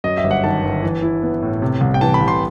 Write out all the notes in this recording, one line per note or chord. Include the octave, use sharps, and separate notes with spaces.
F#2 D#5
E5
G1
F#5
D#3 A5
G1
E3
E4
B3
A2
C3
C2
G5
E3 A5
B5
C2
C6